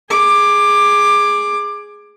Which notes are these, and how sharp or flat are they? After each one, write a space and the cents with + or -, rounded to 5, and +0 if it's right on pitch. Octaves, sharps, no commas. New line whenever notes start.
G#4 +0 D6 +15